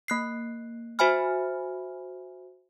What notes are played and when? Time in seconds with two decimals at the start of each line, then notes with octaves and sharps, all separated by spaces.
0.08 A#3 F#6 C7
0.99 F#4 C5 E5 G#5 B5 F6